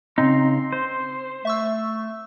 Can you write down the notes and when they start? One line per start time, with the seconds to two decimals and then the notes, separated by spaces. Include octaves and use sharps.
0.18 C#3 C4 D#4 C6
0.73 C5
1.45 A3 E5 C#6 E6